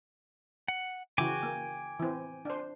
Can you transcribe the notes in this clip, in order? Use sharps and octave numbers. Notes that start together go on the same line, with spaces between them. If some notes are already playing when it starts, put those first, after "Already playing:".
F#5
C#3 E3 F#4 G5 G#5 D6
A#3
E3 C4
D4 C5